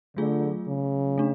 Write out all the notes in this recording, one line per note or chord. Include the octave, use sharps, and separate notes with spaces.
D3 F#3 A3 F4 G#4
C#3
A3 D4